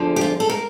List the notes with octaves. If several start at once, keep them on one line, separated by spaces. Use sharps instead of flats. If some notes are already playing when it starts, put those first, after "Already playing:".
Already playing: E2 D3 F3
G4
F4
A4
A#4